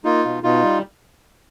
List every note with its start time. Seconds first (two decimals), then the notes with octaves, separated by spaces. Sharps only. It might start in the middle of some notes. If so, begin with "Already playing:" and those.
0.04 A#3 D#4 F4
0.24 B2
0.43 B2 D#4 F4
0.63 G3